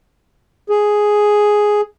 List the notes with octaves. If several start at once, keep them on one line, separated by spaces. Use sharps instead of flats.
G#4